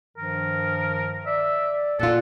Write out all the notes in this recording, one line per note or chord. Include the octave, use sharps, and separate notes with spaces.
G2 D#3 F3 A#4
D5 E5
A#2 F4 A4 D5 F#5